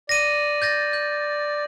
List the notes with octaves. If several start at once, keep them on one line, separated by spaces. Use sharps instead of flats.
D5 A#6 D#7
G6 A6 A#6
G6